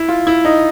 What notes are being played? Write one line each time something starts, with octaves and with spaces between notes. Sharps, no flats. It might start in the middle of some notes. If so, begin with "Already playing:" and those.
Already playing: E4
F4
E4
D#4